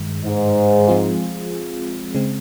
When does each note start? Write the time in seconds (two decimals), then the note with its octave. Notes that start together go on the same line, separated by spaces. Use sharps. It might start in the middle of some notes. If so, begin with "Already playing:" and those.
Already playing: G2 D#3 G#3
0.24 G#2
0.88 F3 G#3 C4 F4 G#4
2.15 C#3 G#3 C4